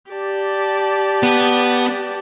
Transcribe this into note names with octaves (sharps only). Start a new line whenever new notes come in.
G4 D5 A5
B3